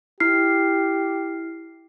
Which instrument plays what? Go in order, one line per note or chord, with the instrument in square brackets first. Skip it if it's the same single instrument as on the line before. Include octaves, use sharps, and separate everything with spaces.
[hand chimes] E4 F6 C7 [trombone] G4